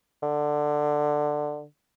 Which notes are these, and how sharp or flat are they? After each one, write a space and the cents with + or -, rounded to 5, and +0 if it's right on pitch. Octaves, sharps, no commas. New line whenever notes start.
D3 +15